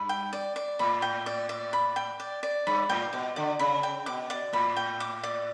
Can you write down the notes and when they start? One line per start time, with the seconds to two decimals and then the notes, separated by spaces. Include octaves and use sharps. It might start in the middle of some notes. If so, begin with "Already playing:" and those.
Already playing: G2 B5
0.09 G5
0.33 D5
0.56 D5
0.79 A2 B5
1.02 G5
1.26 D5
1.49 D5
1.73 B5
1.96 G5
2.20 D5
2.43 D5
2.67 G2 B5
2.89 A2 G5
3.13 B2 D6
3.36 D3 D5
3.59 C#3 B5
3.83 G5
4.06 B2 D6
4.30 D5
4.53 A2 B5
4.76 G5
5.00 D6
5.24 D5